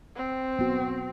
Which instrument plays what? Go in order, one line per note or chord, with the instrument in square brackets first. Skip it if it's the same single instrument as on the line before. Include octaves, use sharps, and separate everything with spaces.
[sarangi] C4
[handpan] B3 F#4